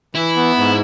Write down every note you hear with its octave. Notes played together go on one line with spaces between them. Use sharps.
E3 E4
B3
G#2